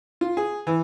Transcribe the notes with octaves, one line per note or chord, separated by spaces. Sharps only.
F4
G#4
E3